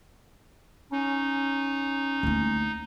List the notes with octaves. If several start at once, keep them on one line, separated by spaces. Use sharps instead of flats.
C#4 D#4
D2 A#3